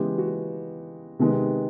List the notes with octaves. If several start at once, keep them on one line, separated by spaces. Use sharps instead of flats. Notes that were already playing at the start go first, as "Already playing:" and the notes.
Already playing: C#3 E3 G#3 B3 G4
F#4
C3 D#3 G#3 B3